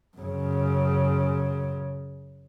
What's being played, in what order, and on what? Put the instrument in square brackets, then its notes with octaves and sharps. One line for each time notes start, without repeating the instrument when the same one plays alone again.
[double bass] F#2 C#3